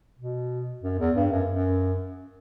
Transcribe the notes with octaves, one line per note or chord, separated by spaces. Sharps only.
B2
F#2
E2
G2
F#2
F#2